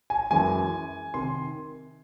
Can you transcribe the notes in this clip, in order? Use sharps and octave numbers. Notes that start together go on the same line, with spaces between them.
G#5
F#2 E3 G#3 G#5
C3 D#3 C6